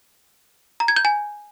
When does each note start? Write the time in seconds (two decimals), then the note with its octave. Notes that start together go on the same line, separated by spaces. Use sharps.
0.80 A#5
0.88 G#6
0.96 G6
1.05 G#5